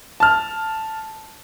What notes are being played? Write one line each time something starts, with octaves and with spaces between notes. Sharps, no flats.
A5 F6